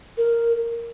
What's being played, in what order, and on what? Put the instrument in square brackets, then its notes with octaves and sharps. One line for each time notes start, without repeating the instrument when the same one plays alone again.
[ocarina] A#4